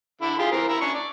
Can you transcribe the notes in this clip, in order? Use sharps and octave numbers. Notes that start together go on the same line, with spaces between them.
D3 E4
F4 G4 G#4
E3 C4 A#4
E4 E5 A#5
C#4 D4 C#6
D5